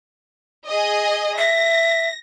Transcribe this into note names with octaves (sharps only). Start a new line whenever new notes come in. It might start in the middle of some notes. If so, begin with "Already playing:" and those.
G#4 D#5
E5 A#6